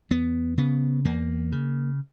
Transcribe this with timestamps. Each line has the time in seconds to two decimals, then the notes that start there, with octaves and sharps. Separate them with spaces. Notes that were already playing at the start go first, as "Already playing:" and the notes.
0.10 E2 B3
0.57 C#3 B3
1.05 E2 A#3
1.52 C#3